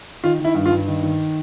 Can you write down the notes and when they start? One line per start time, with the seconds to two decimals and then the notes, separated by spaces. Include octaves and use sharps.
0.24 D#3 F4
0.40 D#3 E4
0.55 G2
0.66 F4
0.72 G2
0.88 D#3
1.03 D#3